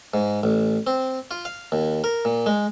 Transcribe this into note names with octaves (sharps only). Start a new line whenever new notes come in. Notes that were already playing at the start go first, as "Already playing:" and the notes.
G#2
A1
C4
F4
F5
D#2
A#4
A#2
G#3